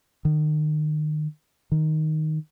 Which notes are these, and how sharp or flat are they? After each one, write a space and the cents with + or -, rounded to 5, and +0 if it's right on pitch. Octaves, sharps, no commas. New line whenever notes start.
D#3 -35
D#3 +0